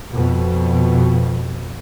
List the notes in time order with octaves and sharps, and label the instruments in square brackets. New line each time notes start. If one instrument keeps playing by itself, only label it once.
[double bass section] F2 B2